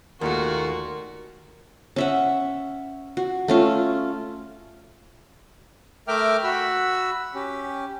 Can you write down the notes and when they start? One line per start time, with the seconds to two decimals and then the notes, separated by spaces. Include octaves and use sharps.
0.21 D#2 A#2 A3 F#4 A#4
1.96 C#4 E5 F#5
3.17 F#4
3.48 A3 C#4 F4
6.08 A3 A#4 E5 G5 D6 F6
6.43 F#4 B5 E6
7.34 C#4 G4